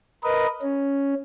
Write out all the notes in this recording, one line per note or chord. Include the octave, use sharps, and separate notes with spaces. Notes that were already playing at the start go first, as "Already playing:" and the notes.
A#4 B4 D#5
C#4